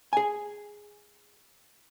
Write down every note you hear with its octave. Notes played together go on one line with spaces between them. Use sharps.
G#4 G#5